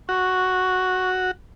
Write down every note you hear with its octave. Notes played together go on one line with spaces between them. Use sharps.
F#4 C#6